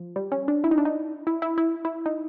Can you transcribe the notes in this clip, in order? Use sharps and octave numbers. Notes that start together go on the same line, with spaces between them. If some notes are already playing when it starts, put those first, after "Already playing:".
Already playing: F3
G3
C#4
D4
E4
D#4
D4
D#4
E4
E4
E4
E4
D#4